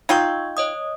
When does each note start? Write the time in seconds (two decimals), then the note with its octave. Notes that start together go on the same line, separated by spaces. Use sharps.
0.09 D#4 F4 G5 C#6 E6 G#6
0.57 C#5 D#5 D#6